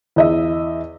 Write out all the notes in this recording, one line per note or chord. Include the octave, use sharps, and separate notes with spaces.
E2 D#5 E5